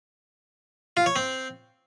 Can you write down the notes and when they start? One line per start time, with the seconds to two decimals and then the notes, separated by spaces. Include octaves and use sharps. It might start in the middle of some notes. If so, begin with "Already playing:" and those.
0.97 F4
1.06 C#5
1.16 C4